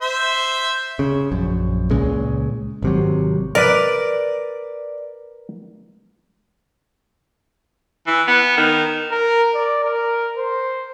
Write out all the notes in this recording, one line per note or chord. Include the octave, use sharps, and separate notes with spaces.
C5 E5
C#3
A#1 F#2
C#2 A#2 C#3 G#3
G#1 C3 F#3
A#4 B4 D5
E3
B3
D#3
A#4
D5
A#4
C5